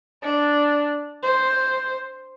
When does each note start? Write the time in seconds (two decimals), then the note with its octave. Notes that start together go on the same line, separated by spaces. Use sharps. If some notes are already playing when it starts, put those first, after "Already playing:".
0.22 D4
1.23 C5